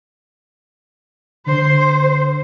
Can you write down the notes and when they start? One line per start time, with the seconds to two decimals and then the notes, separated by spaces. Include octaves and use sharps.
1.46 D3 C5